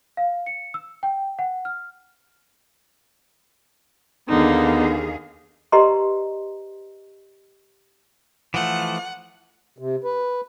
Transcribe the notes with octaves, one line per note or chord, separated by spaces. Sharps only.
F5
C#7
E6
G5
F#5
F6
D#2 D3 B3 D#4 G#4 F5
G4 B4 D5 D#5 A#5 C6
E3 F3 A3 F#5
C3
B4